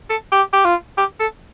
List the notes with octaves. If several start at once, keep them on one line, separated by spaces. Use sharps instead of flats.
A4
G4
G4
F4
G4
A4